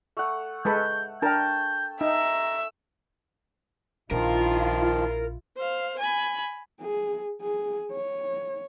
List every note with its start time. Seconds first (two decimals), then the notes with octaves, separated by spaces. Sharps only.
0.17 A3 F#5
0.65 G#3 A4 B4 G6
1.22 D4 A#4 G5 A5 G6
2.01 D#4 E5 A#5
4.11 A#1 D#3 F3 D4 E4 F4 A#4
5.57 C5 F5
5.99 G#5 B5
6.81 G#4
7.42 G#4
7.93 C#5